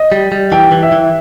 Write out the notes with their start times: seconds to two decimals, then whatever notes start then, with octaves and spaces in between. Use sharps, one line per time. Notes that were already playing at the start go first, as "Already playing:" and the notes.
Already playing: D#5
0.12 G3
0.32 G3
0.52 E3 G5
0.72 E3
0.83 E5
0.92 E3